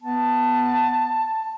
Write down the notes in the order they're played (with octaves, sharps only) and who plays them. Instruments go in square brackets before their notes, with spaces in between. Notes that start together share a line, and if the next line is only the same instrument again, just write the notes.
[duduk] B3 [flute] A5